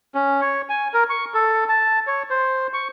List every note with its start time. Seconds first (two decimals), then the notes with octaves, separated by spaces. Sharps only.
0.15 C#4
0.41 C#5
0.69 G#5
0.94 A#4
1.10 C#6
1.34 A4
1.69 A5
2.07 C#5
2.30 C5
2.74 C#6